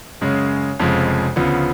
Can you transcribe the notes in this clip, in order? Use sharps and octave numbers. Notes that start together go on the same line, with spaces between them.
F#2 C#3 G#3
F1 F2 C#3 F3 G#3
D2 C#3 F3 B3